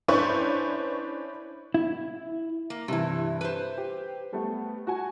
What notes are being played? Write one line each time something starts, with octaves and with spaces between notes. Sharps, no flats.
C#4 D4 E4 B4 C5 C#6
E4
A#3
G2 C3 E3 E4
B4 C5
G4
G3 A3 B3
F#4 G#5